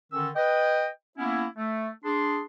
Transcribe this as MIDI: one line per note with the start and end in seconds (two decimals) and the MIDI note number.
0.13 0.29 50
0.13 0.29 51
0.13 0.29 61
0.13 0.29 69
0.13 0.29 88
0.35 0.89 71
0.35 0.89 75
0.35 0.89 79
1.18 1.46 58
1.18 1.46 59
1.18 1.46 61
1.18 1.46 64
1.57 1.89 57
2.04 2.42 62
2.04 2.42 68
2.04 2.42 84